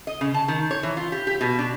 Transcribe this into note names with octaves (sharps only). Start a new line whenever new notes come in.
D#5
C#3
A5
D#3
C#5
E3
F4
G4
G4
B2
D4